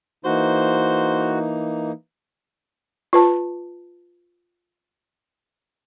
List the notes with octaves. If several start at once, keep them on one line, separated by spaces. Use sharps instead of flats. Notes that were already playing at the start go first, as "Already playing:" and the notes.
E3 A#3 D#4 F#4 C5
F4 B4 A5